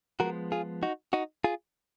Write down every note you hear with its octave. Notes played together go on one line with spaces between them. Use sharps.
F3 G#3 B3 F#4 A#4
F4 G#4
D#4 F#4
D#4 F#4
F4 G#4